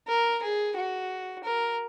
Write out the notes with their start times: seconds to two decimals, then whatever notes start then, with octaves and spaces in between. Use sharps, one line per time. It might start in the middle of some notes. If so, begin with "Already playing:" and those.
0.08 A#4
0.42 G#4
0.76 F#4
1.44 A#4